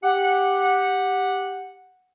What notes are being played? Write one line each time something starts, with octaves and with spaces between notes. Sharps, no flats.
G4 F#5